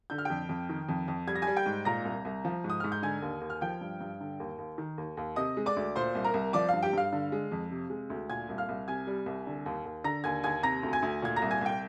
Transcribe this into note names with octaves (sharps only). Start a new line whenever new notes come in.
D3 G6
F6
F2 G5 G6
F2
D#3
F2
F2
G3 G#6
A#6
G3 G#5 G#6
G5 G6
G#2
A#2 A#5 A#6
C2
C2
F3
G#2
D#6
G#2 F6
G6
D3 G#5 G#6
D#2
D#2
F6
F3 G5 G6
G2
G2
D3
D#2
D#2
D#3
D#2
D#2
C3 D#5 D#6
G#3
D5 D6
D2
A#2 C5 C6
C2
A#4 A#5
C2
F3 D5 D6
G2 F5
G4 G5
G2 F5 F6
D3
G#3
F2
C3
G#3
D2
A#2 G#5 G#6
C2
F5 F6
C2
C3 G#5 G#6
G3
C2
D3
D#2
D#2
D3 A#5 A#6
D#2 G#5 G#6
D#2 G#5 G#6
C3 A#5 A#6
D2
G#5 G#6
D2
A#2 G#6
A#5 A#6
C2
G#5 G#6
C2 G5 G6